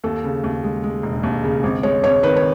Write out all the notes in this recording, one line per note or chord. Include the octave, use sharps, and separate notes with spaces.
D#2 A4
C#3
D#2
G#3
G#3
E1
D#2
C#3
G#1
G#3 C#5
G#1 C#5
D#3 B4
C#5